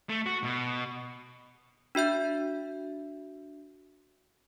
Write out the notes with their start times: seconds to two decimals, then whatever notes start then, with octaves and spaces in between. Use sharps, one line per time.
0.09 A3
0.26 F#4
0.44 B2
1.95 D4 F#4 E5 G6